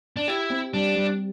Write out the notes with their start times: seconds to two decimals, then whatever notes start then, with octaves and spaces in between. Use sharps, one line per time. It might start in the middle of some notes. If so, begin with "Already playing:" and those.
0.16 D4
0.28 E4 G4
0.50 C4
0.73 G3 D4
0.96 G3